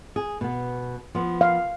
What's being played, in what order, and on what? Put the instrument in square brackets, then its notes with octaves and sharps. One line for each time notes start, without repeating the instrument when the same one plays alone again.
[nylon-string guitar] G#4
B2 B3
F3 B3
[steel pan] F5